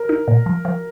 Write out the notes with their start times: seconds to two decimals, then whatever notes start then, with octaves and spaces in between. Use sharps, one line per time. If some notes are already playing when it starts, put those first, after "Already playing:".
Already playing: A#4
0.09 D#4
0.28 A#2
0.46 F3
0.65 F3